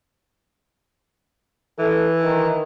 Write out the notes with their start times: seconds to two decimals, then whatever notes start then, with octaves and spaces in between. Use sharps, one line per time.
1.79 E3 A4
2.24 D#3